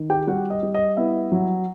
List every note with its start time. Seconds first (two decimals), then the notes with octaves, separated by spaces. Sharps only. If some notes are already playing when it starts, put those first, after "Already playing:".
Already playing: D#3
0.10 G4 G5
0.27 G3 F#4 F#5
0.50 D#5
0.63 G3
0.74 D#5
0.97 B3 E4 E5
1.32 F#3